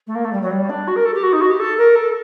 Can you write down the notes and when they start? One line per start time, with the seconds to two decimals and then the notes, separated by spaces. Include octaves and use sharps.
0.07 A3
0.15 A#3
0.24 A3
0.32 G3
0.42 F#3
0.51 G3
0.69 D4
0.87 F#4
0.95 A#4
1.05 A4
1.14 G4
1.23 F#4
1.32 D#4
1.41 F#4
1.50 G4
1.59 A4
1.77 A#4
1.95 A4